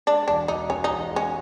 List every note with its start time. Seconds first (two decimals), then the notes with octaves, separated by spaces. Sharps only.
0.07 G#3 D4
0.28 E1 D4
0.48 E1 D#4
0.70 E1 C#4
0.84 D#4
0.91 E1
1.11 G#3
1.16 C#4